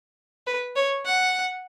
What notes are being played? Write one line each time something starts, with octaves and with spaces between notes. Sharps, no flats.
B4
C#5
F#5